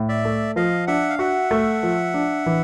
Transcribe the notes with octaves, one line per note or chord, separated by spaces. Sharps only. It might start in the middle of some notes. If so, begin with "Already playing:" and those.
Already playing: A2
D5 E5
A3
F3 D#5 F5
D4 E5 F#5
F5
F#4 E5 F#5
A3
F3
D4
E3